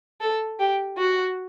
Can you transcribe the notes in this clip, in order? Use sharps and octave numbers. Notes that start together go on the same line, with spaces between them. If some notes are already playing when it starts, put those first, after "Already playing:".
A4
G4
F#4